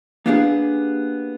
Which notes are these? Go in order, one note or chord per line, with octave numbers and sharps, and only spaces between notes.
A#3 B3 D4 F4 G4 G#4